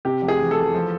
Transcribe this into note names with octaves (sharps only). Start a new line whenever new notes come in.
C3 G4
F1
G#4
E2
E2 A4
F3